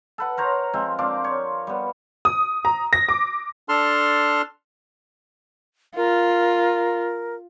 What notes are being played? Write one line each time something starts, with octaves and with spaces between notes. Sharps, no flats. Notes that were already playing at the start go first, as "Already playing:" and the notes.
A4 B4 F#5
A#4 C5 C#5 A#5
F3 G#3 C4
C4 D4 F4 D6
C#5
G3 B3
D#6
A#5
A#6
D6
D4 A4 A5 C6 F6
F4 A#4